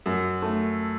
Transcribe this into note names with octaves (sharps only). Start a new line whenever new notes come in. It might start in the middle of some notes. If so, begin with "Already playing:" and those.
F#2
A3